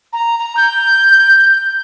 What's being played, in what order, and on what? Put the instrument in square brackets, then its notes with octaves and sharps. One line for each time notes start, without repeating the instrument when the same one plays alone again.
[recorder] A#5
A#5
G6